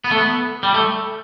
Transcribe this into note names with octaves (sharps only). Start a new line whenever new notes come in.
B3
A3
B3
G3
A3